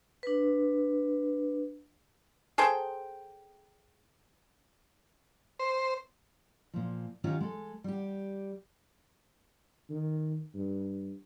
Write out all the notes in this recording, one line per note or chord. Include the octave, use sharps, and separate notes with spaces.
D4 B4
G#4 A4 C5 G5
C5
A#2 F3
D#3 C#4 D#4 F4 G4
G#3 A4
G3 G4
D#3
G2